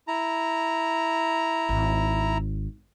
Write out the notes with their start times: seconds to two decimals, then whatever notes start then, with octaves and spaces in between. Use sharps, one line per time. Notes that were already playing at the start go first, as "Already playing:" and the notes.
0.08 E4 A#5
1.69 G#1